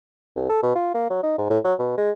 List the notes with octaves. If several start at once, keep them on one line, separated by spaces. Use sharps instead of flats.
C2
A4
B2
F4
A#3
F#3
D#4
G#2
A2
F#3
B2
G#3